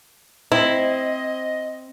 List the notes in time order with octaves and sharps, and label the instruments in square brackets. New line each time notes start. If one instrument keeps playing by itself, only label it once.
[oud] C4 [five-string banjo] E4 [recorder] D#5